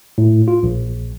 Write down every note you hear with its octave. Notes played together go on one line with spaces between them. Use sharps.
A2
F4
A#1